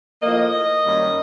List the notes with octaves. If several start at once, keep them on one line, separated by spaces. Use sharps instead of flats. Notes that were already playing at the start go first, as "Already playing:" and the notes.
A2 F3 A#3 D#5
F#2 D#3 G3 A#3